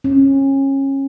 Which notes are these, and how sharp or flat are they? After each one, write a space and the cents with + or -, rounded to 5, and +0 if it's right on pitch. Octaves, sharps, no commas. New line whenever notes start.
C#4 -25